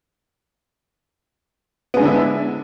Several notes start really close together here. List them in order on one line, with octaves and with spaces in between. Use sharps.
B3 G#3 D3 D4 E4